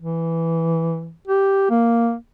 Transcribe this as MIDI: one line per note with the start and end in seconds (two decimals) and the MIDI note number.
0.01 1.13 52
1.27 1.65 67
1.70 2.15 58